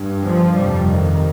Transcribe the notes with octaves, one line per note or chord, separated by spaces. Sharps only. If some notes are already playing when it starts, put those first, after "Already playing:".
Already playing: G2
F3
F2 C3 G3
D#3